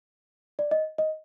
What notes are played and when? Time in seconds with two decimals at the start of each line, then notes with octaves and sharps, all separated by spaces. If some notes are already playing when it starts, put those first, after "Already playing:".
0.59 D5
0.71 D#5
0.98 D#5